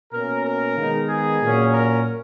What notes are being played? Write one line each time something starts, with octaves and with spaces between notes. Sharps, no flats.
B2 A#3 C#4 A#4
A#4
D#3 G#3 B3 D#4
G#4
A#2 F#3 A#3 C#4
A#4